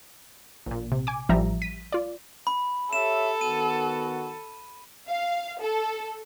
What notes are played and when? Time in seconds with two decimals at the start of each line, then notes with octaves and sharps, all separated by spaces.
0.66 A#1 A#2
0.92 C3
1.07 G#5 D6
1.29 A1 F3 G3 E5 A#5
1.62 B6 D#7
1.92 F4 D5
2.47 B5
2.93 G4 A4 C#5 E5 E7
3.41 D#3 B3 F#4 D#7
5.09 F5
5.60 A4